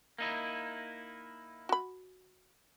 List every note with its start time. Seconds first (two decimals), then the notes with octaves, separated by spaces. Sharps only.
0.18 A#3 D#4 E4
1.69 F#4 B5